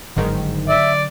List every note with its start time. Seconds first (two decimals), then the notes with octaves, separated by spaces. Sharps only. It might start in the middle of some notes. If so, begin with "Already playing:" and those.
0.16 G1 G#2 D3 D#3 F#3
0.68 D5 E5